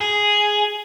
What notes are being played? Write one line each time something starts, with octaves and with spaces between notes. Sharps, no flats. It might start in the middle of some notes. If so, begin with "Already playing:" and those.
G#4